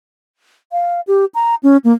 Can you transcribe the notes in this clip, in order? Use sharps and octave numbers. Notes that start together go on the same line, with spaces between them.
F5
G4
A#5
C#4
A#3